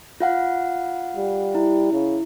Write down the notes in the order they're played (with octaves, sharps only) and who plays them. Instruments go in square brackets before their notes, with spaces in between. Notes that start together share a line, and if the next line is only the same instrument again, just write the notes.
[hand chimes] F4 F5 F#5
[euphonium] G3
[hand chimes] E4
[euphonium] C#3